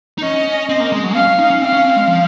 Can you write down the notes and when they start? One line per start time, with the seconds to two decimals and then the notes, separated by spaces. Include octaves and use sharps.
0.18 D#4
0.23 C#4 D#5
0.69 C4
0.80 A#3
0.92 G#3
1.04 F#3
1.15 C#4 F5
1.27 C#4
1.39 D#4
1.50 C#4
1.61 C4 F5
1.73 C#4
1.85 C4
1.96 G#3
2.08 F3